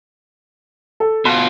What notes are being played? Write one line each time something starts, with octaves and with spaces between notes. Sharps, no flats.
A4
B2 F4 C6